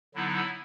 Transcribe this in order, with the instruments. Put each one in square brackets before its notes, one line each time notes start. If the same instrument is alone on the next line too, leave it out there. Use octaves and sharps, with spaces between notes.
[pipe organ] D3 F#3 B3 D#4 E4